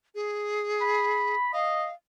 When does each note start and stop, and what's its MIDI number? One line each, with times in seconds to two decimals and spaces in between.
0.15 1.36 68
0.81 1.50 83
1.53 1.86 75
1.53 1.93 77